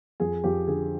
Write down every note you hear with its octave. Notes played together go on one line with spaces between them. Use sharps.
F2 G#4
F2 G4
D3 G#4